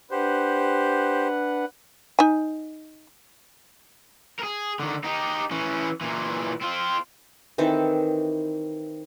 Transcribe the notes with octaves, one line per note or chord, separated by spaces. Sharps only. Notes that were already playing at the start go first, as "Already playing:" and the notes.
D4 G4 B4 C5 F#5
D#4 G#5
G#4 A#4
D3 D#3
D#4 G4
E3 C#4
A#2 E3
C4 F4
D#3 E3 C4 A4